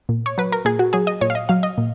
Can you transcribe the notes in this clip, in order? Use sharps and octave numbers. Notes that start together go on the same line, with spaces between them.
A#2
C#5
F#3 B4
A#4
A#2 G#4
F#4
F#3 G#4
D#5
A#2 C#5
F5
D#5
F#3 F5
D#5
A#2